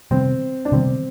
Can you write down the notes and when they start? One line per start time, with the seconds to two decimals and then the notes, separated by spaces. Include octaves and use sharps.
0.11 C3 D#3 G3 B3 C4
0.65 D4
0.72 C3 D#3 G3 B3 C4